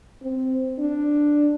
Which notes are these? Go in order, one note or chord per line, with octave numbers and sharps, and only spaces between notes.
C4
D4